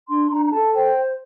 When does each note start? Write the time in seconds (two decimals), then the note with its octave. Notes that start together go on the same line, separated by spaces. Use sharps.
0.09 D4 C6
0.30 D4 A#5
0.43 A#5
0.52 A4 A5
0.74 C5 G5